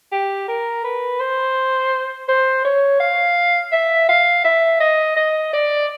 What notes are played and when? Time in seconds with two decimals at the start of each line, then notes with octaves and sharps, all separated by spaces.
0.12 G4
0.48 A#4
0.84 B4
1.20 C5
2.29 C5
2.65 C#5
3.00 F5
3.72 E5
4.09 F5
4.44 E5
4.80 D#5
5.16 D#5
5.53 D5